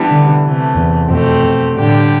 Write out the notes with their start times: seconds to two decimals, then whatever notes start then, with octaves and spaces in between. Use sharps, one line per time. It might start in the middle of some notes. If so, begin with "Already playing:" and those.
Already playing: E3 G3 B3 D4
0.09 D3
0.43 C3 E3 A3
0.76 E2
1.08 F2 B2 A3 C4 G4
1.42 F2
1.75 A2 D3 G3 D4 G4